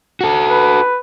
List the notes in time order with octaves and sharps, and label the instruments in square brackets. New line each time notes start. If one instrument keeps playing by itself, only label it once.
[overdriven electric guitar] F#4 A4
[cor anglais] B4